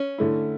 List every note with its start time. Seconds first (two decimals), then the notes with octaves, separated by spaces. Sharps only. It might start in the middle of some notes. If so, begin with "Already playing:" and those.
Already playing: C#4
0.18 D3 A3 E4